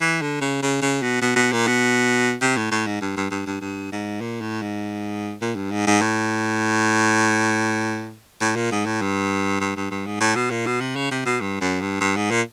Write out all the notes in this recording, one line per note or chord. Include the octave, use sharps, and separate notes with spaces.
E3
D3
C#3
C#3
C#3
B2
B2
B2
A#2
B2
C3
A2
A2
G#2
G2
G2
G2
G2
G2
G#2
A#2
A2
G#2
A#2
G2
G#2
G#2
A2
A2
A#2
G#2
A2
G2
G2
G2
G2
G#2
A2
B2
A#2
B2
C3
C#3
C3
B2
G2
F#2
G2
G2
G#2
A#2